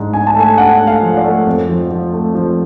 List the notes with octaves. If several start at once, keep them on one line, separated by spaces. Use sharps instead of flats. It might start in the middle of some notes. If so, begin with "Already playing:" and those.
Already playing: G#2 D4
D4 G#5
A5
A3 G#5
D4 F#5
A3
F5
F3
D5
A3
F2
F3
F3
A3
F3